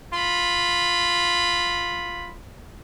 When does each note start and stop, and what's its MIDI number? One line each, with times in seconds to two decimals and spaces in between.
0.14 2.34 65
0.14 2.34 83